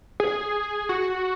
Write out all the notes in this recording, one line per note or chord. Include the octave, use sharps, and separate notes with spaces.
G#4
F#4